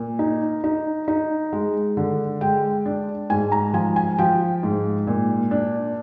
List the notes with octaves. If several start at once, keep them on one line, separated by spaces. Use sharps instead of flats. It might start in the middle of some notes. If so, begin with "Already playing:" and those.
Already playing: A#2
D#4
D#4
D#4
G#3
D3
G#3 G5
D4
G#2 G#5
A#5
F3 G#5
G#5
F3 G5
G#2
A#2
D4